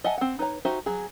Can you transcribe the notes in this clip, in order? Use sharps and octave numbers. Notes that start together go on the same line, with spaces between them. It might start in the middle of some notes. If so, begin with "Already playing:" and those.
D#5 E5 F#5 G#5 A5
C4 F#5
D#4 B4 C#5 A#5
D#4 F#4 G4 C5 E5
F#3 G#4